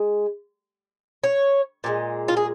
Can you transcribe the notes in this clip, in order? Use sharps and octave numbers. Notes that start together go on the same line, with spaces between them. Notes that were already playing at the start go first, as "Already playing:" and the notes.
Already playing: G#3
C#5
A#2 F3 G#3
F4
G#4